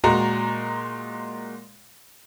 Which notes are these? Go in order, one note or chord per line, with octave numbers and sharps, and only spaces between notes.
A#2 G#3 F#4 A#5